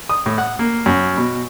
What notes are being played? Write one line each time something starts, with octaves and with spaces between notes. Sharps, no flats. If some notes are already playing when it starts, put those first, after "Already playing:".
D#6
A2
F#5
A#3
F#2
B2